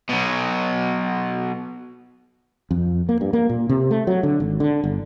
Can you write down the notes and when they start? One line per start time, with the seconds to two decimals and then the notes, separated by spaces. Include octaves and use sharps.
0.09 B2 F#3
2.71 F2
3.09 A#3
3.21 G2
3.33 A#3
3.49 A#2
3.69 C3
3.91 A3
4.07 F#3
4.23 D3
4.40 G#1
4.60 D3
4.84 G1